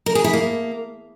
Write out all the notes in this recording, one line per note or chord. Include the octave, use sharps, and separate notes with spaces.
A#4
G#4
E4
A#3